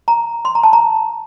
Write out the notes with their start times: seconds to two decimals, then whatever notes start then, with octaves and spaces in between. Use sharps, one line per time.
0.08 A#5
0.45 C6
0.55 A#5
0.63 A5
0.73 A#5